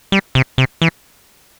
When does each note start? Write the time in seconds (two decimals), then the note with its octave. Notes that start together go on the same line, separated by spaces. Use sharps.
0.12 G3
0.35 C3
0.58 C3
0.82 E3